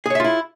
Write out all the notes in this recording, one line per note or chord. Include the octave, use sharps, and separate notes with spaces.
E4 F4 G#4 C#5 E5